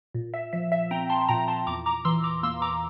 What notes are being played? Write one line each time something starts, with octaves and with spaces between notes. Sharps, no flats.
A#2
E5
F3 E5
E5
C4 G5 A#5
A5 C6
A#2 G5 A#5
A5 C6
E2 A#5 D6
A#5 D6
E3 C6 E6
A#5 D6
A#3 C6 E6
A#5 D6